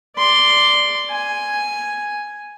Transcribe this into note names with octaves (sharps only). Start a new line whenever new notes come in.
D5 C6
G#5